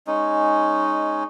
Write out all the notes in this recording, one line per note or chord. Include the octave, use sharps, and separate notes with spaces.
G#3 C#4 D#4